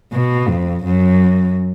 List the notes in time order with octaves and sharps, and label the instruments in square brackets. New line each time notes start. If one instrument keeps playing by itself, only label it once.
[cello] B2
F2
F#2